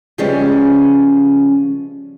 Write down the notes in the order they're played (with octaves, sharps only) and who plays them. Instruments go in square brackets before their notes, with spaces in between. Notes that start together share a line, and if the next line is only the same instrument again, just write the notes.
[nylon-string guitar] C#3 F3 G3 G#3 B3 C#4